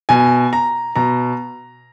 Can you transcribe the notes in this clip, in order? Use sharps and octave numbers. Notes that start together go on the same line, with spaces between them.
B2 G#5
A#5
B2 A#5